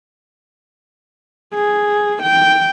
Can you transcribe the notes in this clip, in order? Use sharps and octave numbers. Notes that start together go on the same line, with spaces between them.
G#4
G5